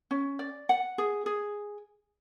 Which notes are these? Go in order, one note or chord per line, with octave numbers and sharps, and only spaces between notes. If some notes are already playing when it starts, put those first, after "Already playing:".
C#4
D5
F#5
G#4
G#4